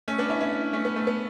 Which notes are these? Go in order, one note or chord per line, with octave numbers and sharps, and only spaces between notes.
A3 C#4
B3 D4
C#4 E4
C#4 E4
A3 C#4
B3
A3
B3